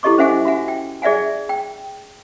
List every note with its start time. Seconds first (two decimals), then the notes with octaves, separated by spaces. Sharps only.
0.03 E4 G4 A4 D#5 C#6 D6
0.18 C#4 C5 E5 F#5 G#5 D6
0.45 F#4 E5 F#5 G#5
0.68 G5
1.02 G#4 D5 E5 F#5 G#5
1.49 G5